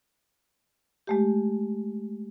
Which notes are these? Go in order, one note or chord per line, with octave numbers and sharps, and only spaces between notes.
G#3 A3 G4